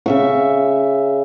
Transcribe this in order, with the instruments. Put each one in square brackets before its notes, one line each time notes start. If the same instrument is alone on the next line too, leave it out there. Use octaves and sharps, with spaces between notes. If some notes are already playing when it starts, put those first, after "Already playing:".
[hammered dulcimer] C#3 E5 C#6